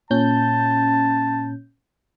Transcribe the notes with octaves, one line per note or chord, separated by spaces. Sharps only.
A#2 C#4 A5 G6